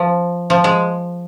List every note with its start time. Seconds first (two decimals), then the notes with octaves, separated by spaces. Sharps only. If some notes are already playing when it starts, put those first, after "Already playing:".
Already playing: F3
0.50 F3
0.64 G#3